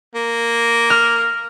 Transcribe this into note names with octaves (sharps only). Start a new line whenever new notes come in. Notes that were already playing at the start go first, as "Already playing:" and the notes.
A#3
F6